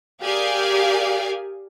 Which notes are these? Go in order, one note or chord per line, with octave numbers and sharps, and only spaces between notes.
G4 G#4 A#4 D5 F5 G#5